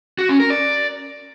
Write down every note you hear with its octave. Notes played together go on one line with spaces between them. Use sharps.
F#4
C#4
A#4
D5